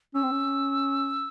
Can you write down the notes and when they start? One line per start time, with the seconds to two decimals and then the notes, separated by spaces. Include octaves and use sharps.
0.14 C#4 E6
0.23 C4
0.31 C#4